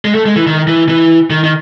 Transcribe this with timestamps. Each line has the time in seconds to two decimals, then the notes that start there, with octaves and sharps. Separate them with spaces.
0.05 G#3
0.15 A3
0.26 G#3
0.36 E3
0.47 D#3
0.67 E3
0.88 E3
1.30 D#3
1.43 D#3